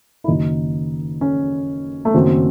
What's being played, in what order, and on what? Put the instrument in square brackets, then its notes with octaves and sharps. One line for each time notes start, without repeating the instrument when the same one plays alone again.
[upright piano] E4
F#1 F#2 D#3 D#4
C#4
A3
F#1 F#2 D#3 C4